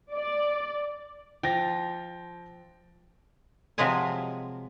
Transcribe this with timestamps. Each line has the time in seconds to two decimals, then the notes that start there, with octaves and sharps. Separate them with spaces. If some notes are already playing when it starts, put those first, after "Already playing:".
0.13 D5
1.43 F3 G5 A6 A#6
3.78 C3 F3 F#3 G#3 G#5